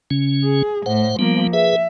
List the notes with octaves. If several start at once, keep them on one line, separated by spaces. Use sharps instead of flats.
C#3 C#4
G#4
A2 C5 F#5
F3 G3 A#3 B3
G#4 B4 E5